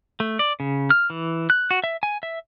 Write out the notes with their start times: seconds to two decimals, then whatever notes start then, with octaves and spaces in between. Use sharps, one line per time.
0.20 A3
0.39 D5
0.60 C#3
0.90 F6
1.10 E3
1.50 F#6
1.71 F#4
1.84 E5
2.03 G#5
2.23 E5